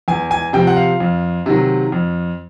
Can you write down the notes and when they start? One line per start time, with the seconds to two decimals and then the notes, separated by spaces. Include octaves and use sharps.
0.08 E2 G#5
0.31 G#5
0.53 C3 F3 G5
0.67 F#5
0.76 F5
1.00 F2
1.46 C3 D#3 F#3
1.92 F2